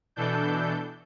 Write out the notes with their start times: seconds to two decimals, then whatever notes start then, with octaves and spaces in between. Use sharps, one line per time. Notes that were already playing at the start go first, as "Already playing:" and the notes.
0.16 B2 E3 D4 A4 G6